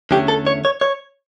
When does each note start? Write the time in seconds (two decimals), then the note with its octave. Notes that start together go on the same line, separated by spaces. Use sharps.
0.11 E2 D3 A3 C#4 G4
0.28 A4
0.46 C#5
0.65 C#5
0.81 C#5